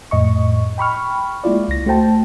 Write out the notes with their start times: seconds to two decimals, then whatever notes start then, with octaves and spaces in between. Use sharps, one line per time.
0.11 F2 A2 D#5 C#6
0.78 G5 B5 C#6 F6
1.44 G#3 A#3 E4 F4 D5
1.68 C#2 A#6
1.86 A3 F#4 C5 G5 A5